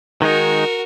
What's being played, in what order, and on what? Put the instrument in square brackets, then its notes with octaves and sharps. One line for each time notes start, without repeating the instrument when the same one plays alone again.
[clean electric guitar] D#3 G#3 D#4 [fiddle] F#4 A#4